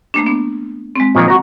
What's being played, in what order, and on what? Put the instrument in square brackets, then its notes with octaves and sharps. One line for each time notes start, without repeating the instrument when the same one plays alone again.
[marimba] A3 A#3 D4
B3 D4
G#3 C4
[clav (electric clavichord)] A#2 D#3 F3
F#4 A#5